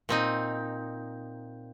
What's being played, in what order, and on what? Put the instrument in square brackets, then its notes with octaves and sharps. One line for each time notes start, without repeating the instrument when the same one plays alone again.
[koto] A#2 C4 D#4